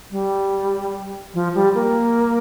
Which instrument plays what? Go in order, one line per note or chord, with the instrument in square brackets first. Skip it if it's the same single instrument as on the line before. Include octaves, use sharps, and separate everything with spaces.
[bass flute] G3
F3
G3
A#3